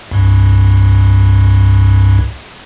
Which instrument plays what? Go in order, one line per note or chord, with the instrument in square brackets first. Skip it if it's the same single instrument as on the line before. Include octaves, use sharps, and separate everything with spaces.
[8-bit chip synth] C2 G2